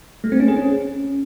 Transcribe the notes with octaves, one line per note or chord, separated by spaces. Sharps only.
A3
C4
C#4
G#4
C#4